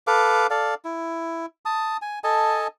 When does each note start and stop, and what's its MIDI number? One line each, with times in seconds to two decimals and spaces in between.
0.07 0.47 69
0.07 0.47 71
0.07 0.47 77
0.07 0.47 86
0.50 0.74 69
0.50 0.74 74
0.50 0.74 77
0.85 1.46 64
1.65 1.97 81
1.65 1.97 87
2.02 2.19 80
2.24 2.67 69
2.24 2.67 75
2.24 2.67 80
2.24 2.67 81